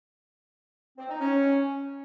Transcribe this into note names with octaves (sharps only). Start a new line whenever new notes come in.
C4
D#4
C#4